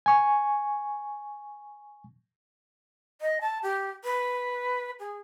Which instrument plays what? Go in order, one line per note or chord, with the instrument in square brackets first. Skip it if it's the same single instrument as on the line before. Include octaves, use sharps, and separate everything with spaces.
[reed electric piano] G#5 C#6
[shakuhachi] D#5
A5
G4
B4
G#4